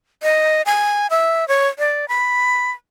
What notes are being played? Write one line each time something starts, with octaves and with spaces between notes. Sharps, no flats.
D#5
G#5
E5
C#5
D5
B5